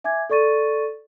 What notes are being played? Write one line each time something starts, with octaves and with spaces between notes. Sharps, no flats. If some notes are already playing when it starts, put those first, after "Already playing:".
E5 G#5 D6 G#6
A4 D5 C#6 A6 D#7